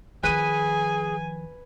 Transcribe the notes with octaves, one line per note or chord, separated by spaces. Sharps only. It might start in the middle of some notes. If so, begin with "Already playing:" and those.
D#3 F3 G#4 B4 G#5 D#7